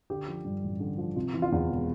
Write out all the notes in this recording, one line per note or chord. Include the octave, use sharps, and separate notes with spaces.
D3 G4
F3
G2
A1
D3
F3
C3 F4
E3
F4
E2
E1